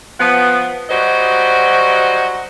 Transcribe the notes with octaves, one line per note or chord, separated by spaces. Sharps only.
F3 B3
F#3 G3 F#4 C5 D#5